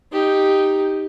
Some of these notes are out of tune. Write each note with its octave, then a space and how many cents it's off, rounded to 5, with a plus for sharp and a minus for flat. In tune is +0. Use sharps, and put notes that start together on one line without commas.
D#4 +0 G4 +0